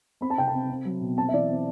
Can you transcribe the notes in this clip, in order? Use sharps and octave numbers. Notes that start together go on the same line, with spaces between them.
C4 B5
A5
C3 G5
A5
C4
C4
F#3
B2
C4 A5
E5
E3 D5
C4